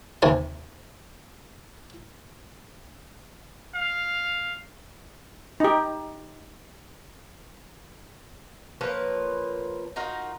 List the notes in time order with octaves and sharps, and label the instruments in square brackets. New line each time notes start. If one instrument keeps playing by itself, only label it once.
[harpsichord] D#2 C3 G#5 A5
[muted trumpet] F5
[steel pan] D#4 G4
[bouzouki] F3 A#3 B4 C#5
D#4 F4 F#4 A#4